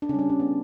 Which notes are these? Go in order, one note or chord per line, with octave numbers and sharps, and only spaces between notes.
D4
C#3 C#4
G3 D4
C#4
B3